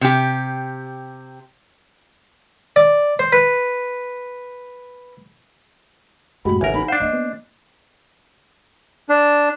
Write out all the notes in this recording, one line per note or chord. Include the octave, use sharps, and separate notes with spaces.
C3 G4
D5
C5
B4
F#2 A2 G#3 F#4 G4 B5
A1 D3 C4 A#4 E5 F#5 G#5
D#4 B5
D4 C5 F5 F#5
A#3 C#4 D#5
B3
D4